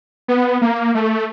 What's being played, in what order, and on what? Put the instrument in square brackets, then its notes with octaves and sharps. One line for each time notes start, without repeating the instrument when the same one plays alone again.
[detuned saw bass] B3
A#3
A3